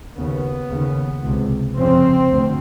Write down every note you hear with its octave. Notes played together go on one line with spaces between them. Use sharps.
D#2 C#3 B3
D#2 C#3
C#2 C3
F2 C#3 C4
D2